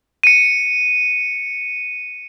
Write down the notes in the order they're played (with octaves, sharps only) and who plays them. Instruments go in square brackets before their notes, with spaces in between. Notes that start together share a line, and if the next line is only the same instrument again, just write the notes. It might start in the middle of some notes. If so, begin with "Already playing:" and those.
[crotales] C#7 D#7